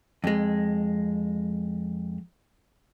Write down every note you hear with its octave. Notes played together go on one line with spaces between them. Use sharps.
F2 G#3